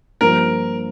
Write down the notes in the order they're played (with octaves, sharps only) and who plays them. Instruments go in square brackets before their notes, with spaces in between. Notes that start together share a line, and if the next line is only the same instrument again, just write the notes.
[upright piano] G2 F3 A#3 F4 C5 [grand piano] A#4